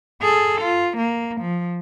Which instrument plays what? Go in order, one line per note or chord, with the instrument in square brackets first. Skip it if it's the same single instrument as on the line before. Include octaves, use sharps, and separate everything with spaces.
[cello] G#4 A4
F4
A#3
F3